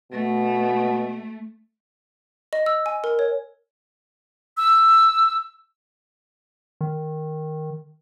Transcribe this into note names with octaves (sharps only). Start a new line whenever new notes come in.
B2 A3
D#5
E6
G#5
A#4
C#5
E6
D#3